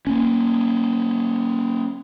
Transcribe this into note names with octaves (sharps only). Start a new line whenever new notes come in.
A#3 C#4